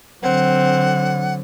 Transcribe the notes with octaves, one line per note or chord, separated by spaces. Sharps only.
D3 F#3 C4 F#5